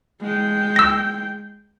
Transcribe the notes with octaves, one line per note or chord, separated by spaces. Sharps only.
G#3 G5
E6 A#6